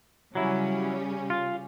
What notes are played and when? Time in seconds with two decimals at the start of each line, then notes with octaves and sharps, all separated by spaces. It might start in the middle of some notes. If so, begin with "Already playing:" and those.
0.35 C#3 F#3 G3 C#4 E4
1.30 F4